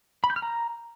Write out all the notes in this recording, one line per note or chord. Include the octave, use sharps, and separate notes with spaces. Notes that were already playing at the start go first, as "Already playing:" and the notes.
B5
G6
F6
A#5